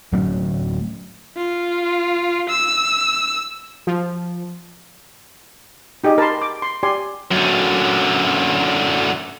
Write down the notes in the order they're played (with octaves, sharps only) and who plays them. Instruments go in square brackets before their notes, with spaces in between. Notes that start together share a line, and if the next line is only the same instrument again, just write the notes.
[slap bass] D1 F#3 A3 C#4
[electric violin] F4
E6
[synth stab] F3
[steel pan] D#4 G4 G#4 D#5
A#4 A5 B5 C6
D6
C6
G4 D5 G#5 C6
[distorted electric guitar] F#2 D3